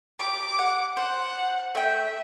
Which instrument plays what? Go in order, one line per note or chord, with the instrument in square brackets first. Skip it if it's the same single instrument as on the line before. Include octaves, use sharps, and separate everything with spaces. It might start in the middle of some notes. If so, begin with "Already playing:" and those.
[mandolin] G4 [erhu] D6
[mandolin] F#5
[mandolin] C5 [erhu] F#5
[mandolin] A3 G5 [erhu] E5